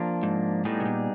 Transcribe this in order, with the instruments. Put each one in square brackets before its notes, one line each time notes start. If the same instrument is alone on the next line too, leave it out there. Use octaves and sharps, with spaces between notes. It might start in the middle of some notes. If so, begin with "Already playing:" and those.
Already playing: [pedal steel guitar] F3 A#3 D4
[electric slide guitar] G#2
[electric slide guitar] A2 [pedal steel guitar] G3 B3 D#4 G#4
[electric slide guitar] B2
A#2